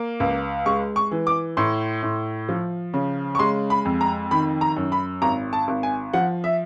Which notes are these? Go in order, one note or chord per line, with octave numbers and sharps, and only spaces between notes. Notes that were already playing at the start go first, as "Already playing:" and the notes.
Already playing: A#3
C#2
G#3 C#6
C#6
E3
D6
A2 C6
A2
F3
C#3
C#6
G#3 C6
B5
F2
A#5
D#3 B5
A#5
F#2
B5
G#1 A#5
A5
G#1
G#5
F3 F#5
E5